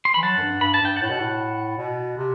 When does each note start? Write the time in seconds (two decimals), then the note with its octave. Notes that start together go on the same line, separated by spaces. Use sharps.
0.05 C6
0.14 E3 B5
0.23 F#3 F#5 A5
0.38 F#2
0.42 G2
0.61 G2 B5
0.74 A5
0.81 G2 G5
0.96 A2 F#5 A5
1.10 B2
1.20 A2
1.78 B2
2.17 C3